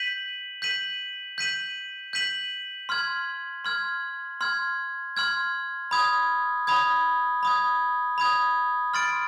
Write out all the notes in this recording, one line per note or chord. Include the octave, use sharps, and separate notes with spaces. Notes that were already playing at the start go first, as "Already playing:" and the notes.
Already playing: G6 B6 D#7 F#7
G6 B6 D#7 F#7
G6 B6 D#7 F#7
G6 B6 D#7 F#7
C6 F6 G#6
C6 F6 G#6
C6 F6 G#6
C6 F6 G#6
B5 D#6 G#6
B5 D#6 G#6
B5 D#6 G#6
B5 D#6 G#6
C6 F6 A6 D7